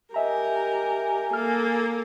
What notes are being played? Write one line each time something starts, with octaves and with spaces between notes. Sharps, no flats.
G4 A#4 D#5 E5 G#5 A#5
A#3 A4 F6